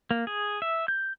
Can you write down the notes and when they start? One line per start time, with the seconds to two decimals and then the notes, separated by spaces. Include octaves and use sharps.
0.11 A#3
0.27 G#4
0.62 E5
0.88 G6